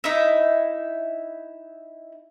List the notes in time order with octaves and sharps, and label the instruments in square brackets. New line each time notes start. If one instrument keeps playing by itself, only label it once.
[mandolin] D#4 E4 E5